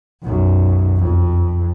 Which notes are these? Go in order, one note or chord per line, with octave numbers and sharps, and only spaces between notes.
B1 F#2
F2